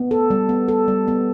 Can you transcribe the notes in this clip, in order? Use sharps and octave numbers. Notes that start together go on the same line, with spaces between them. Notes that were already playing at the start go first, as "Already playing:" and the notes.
Already playing: B3
A4
G3
B3
A4
G3
B3